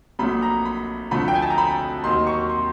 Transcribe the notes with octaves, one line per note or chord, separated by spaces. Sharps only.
A#1 A#2 F#3 A3 B5
A#5
B5
D2 D3 F3 A3 B5
G5
G#5
A5
A#5
B5
D#2 D#3 F#3 C6
C#6
C6